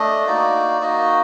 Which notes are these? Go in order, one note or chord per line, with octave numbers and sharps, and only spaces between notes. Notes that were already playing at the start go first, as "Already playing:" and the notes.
Already playing: A3 D4 D#5
A#3 D#4 F#4 D5
A#3 D#4 F#4 D#5